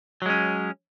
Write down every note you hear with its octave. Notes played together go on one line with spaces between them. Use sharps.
F#3 G#3 C#4